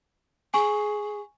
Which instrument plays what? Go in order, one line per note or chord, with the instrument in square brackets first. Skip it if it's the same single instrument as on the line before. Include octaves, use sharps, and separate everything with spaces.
[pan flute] G#4 [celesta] G#5 C#6